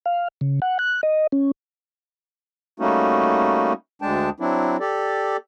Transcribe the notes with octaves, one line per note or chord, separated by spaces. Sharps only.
F5
C#3
F#5
F#6
D#5
C#4
G3 A3 A#3 C#4 D#4 F#4
D2 G#3 D4 G5 A5
F#3 C4 D4 E4
G4 A4 D5